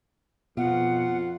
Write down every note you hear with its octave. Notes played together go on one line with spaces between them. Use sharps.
F2 B2 F4 F#5